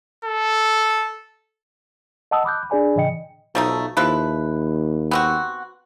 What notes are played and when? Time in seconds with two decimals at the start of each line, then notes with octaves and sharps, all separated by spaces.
0.25 A4
2.31 D#5 F#5 A5 D#6 E6
2.45 B5 D6 F#6 G6
2.70 D4 G#4 D5 G#5 B5
2.96 A2 C#3 E3 D#5 G5 C#7
3.55 B1 F3 A3 D#4
3.97 D#2 F3 E4 B4
5.11 B3 C4 F#4